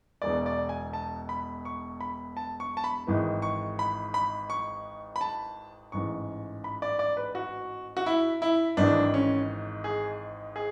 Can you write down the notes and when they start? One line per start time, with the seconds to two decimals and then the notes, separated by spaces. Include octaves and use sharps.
0.22 E1 E2 B2 D5
0.46 D5
0.69 G#5
0.93 A5
1.29 B5
1.65 C#6
2.01 B5
2.37 A5
2.60 C#6
2.77 A5
2.84 B5
3.07 G#1 G#2 E3
3.42 C#6
3.79 B5
4.14 B5
4.50 C#6
5.16 B5
5.21 A5
5.92 A1 G#2 E3 C#6
6.64 B5
6.82 D5
6.99 D5
7.17 B4
7.35 F#4
7.97 F#4
8.06 E4
8.42 E4
8.77 G#1 G#2 E3 D4
9.14 C#4
9.84 G#4
10.56 G#4